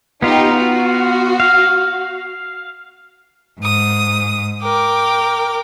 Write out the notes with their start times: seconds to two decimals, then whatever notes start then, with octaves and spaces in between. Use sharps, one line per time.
0.22 B3 D#4 F4 G4
0.55 F#4
1.40 F5
3.59 G#2 D#6
4.63 A#4 G5 D6